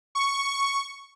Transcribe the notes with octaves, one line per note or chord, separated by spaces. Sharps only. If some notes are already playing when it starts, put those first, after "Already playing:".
C#6